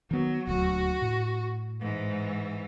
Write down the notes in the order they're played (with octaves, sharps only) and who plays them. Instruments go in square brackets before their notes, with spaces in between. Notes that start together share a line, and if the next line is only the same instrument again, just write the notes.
[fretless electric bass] D#3 B3 [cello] F#3
[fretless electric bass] D#1 D2 F#3 [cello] F#4
[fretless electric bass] A2
[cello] G#2 E3